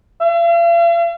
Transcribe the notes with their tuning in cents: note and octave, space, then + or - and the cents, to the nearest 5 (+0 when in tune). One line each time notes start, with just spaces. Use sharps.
F5 -45